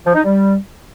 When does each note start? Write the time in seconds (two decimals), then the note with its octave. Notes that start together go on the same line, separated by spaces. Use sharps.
0.05 F3
0.15 D#4
0.24 G3